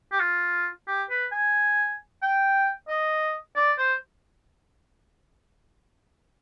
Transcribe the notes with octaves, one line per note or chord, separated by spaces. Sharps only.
G4
F4
G4
B4
G#5
G5
D#5
D5
C5